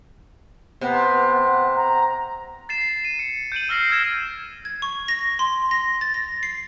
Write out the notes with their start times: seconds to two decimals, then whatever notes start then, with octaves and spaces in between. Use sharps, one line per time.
0.81 C3 B3
1.42 F#5
1.76 A#5
2.69 A6 C7 E7
3.05 D#7
3.19 C#7
3.52 G6 D7 D#7 F#7
3.69 E6 F6 A#6 C7
3.90 E6 F6 G#6 E7
4.65 G#6
4.82 C#6
5.08 A#6
5.39 C6
5.71 A#6
6.01 A6
6.14 A#6
6.43 C7